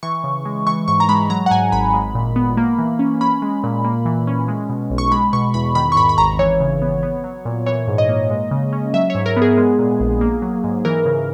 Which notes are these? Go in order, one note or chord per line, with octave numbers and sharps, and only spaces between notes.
E3 C#6
C#3
G#3
E3 C#6
G#2 C#6
A#5
G#3 B5
F#3 A#5
F#5
G#2 G#5
G#1 B5
G#3
A#2
B3
A#3
E3
C#4
C#4 B5
G#3
A#2
A#3
E3
C#4
G#3
B2
B1
C#6
G#3 B5
B2 C#6
E2 B5
D#3 B5
C#6
G#2 B5
B5
G#1 A#5
E3 C#5
C#3
B3
B3
F#3
A#2
E3 C#5
G#2
D#5
A#3
G#3
C#3
C#4
F#3 E5
C#5
G#2
A#4
B3
G#4
G#3
A#2
A#1
A#3
F#3
G#2
E3 A#4
C#3